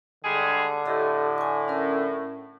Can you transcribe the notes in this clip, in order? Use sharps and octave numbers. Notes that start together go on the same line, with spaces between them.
D3 G3 G#3 G#4
A2 G4 A4 D#5
G#5 C#6
C#4 A#4